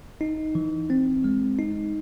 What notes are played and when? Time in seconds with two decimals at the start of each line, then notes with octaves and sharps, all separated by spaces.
0.21 D#4
0.55 E3
0.90 C4
1.24 G#3
1.59 D#4